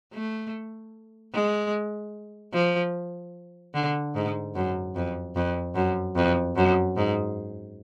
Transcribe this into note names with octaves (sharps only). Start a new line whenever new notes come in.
A3
G#3
F3
D3
G#2
F#2
F2
F2
F#2
F2
F#2
G#2